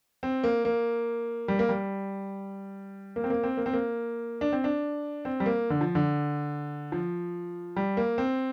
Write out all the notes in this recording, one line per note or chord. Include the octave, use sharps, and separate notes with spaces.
C4
A#3
A#3
G3
A#3
G3
A#3
C4
A#3
C4
A#3
C4
A#3
D4
C4
D4
C4
G3
A#3
D3
F3
D3
F3
G3
A#3
C4